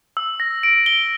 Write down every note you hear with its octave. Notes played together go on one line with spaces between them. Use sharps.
E6
A#6
D7
G7